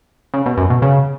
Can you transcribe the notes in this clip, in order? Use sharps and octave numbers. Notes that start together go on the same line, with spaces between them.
C#3
B2
F#2
B2
C#3